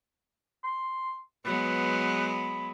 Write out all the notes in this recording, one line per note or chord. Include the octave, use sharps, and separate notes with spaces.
C6
F#3 G#3 B3 B4
B5